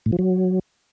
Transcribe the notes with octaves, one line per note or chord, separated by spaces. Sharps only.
A2
F3
F#3